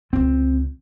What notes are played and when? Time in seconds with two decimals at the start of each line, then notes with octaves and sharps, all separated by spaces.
0.13 C#2 D3 C4